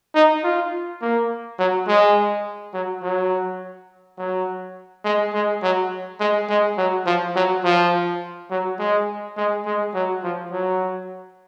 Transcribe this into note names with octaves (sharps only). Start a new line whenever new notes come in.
D#4
F4
A#3
F#3
G#3
F#3
F#3
F#3
G#3
G#3
F#3
G#3
G#3
F#3
F3
F#3
F3
F#3
G#3
G#3
G#3
F#3
F3
F#3